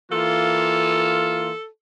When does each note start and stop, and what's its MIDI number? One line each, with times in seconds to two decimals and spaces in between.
0.12 1.50 52
0.12 1.50 58
0.12 1.50 65
0.12 1.66 69